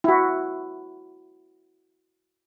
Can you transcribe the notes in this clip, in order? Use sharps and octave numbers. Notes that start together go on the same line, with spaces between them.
E4 F#4